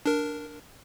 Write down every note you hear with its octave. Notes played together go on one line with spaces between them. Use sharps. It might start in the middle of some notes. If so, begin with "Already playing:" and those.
D4 A#4